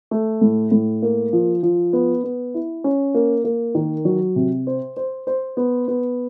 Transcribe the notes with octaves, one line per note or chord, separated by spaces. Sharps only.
A3
A2
A2
A#3
F3
F3
B3
B3
E4
C#4
A#3
A#3
D#3
F#3
C3
C5
C5
C5
B3
B3